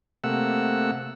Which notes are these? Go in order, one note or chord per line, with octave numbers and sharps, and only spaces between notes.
C3 A3 A#3 F#5 E6